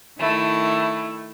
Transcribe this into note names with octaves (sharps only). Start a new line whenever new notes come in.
D#3 A3 E4